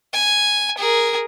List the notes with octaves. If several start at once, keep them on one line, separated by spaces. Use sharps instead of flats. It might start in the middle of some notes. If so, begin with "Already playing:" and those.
G#5
G#4 A#4